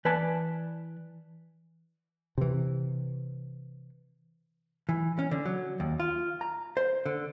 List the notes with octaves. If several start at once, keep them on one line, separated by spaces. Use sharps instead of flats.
E3 B4 D5 G#5 A5
C3 E3
E3
C#4
D3
F#3
D#2
F4
A#5
C5
D3